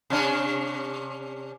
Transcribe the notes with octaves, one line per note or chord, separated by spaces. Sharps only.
C3 C#4 D4